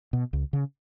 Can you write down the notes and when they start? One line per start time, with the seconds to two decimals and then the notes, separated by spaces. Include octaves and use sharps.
0.13 B2
0.33 C#2
0.53 C#3